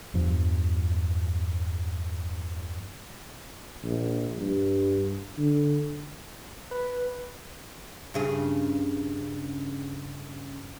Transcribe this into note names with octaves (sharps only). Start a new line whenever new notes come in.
E2 G2 F3
A#1
G2
D3
B4
G2 C#3 G#4